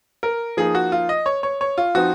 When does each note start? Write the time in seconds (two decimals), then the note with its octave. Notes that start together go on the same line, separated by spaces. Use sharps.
0.23 A#4
0.57 F3 A#3 D#4 G#4
0.75 F#4
0.92 F4
1.09 D#5
1.26 C#5
1.43 C#5
1.61 C#5
1.78 F4
1.95 F3 C4 D#4 F#4